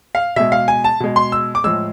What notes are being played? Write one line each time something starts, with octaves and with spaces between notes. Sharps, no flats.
F5
B2 G#3 E5
F5
G#5
A5
B2 G#3
C6
E6
D6
A2 F3 G#3 E6